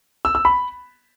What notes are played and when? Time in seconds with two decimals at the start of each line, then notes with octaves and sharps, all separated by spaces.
0.25 E6
0.35 E6
0.45 B5